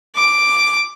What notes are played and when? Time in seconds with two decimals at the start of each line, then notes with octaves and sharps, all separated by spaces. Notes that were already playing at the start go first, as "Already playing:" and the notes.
0.16 D6